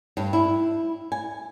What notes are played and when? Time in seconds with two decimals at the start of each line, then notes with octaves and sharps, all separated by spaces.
0.17 G2
0.33 E4
1.12 G#5